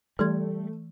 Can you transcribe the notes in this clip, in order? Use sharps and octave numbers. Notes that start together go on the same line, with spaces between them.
E3 G3 A3 C6 G#6